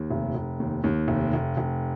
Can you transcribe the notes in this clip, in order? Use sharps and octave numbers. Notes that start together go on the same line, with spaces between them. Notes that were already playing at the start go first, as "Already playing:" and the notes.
Already playing: D#2
F1
F1
D#2
D#2
F1
F1
F1